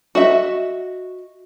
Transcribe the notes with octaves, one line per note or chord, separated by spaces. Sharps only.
F#4 D#5 E5